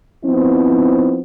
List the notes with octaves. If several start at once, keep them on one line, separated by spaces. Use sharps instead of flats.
F3 B3 C4 D#4 E4